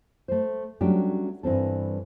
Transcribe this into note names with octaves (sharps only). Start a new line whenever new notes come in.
A3 C5
F#3 G3 A3 C#4 D4 G4
G2 E3 C4 A4